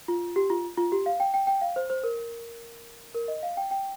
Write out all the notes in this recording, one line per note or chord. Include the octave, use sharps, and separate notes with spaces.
F4
G4
F4
F4
G4
F5
G5
G5
G5
F5
C5
C5
A#4
A#4
D#5
F5
G5
G5